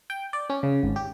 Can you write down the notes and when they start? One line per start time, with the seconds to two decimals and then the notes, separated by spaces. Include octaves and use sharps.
0.10 G5
0.33 D5
0.50 C#4
0.63 C#3
0.83 G#1
0.96 G4